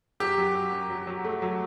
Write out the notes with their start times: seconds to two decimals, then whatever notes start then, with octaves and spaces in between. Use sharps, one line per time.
0.20 F#2 G4
0.38 F#3
0.55 F#2
0.72 F#2
0.90 F#3
1.07 F#3
1.25 A3
1.42 F#3